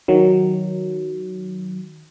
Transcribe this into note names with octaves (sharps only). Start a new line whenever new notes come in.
D#3 F#3